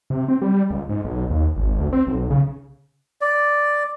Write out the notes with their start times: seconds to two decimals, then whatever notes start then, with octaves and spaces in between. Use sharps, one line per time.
0.10 C3
0.28 C4
0.42 G3
0.70 C#2
0.89 G#2
1.05 B1
1.30 D#2
1.56 G#1
1.79 D2
1.93 C4
2.07 B1
2.30 C#3
3.21 D5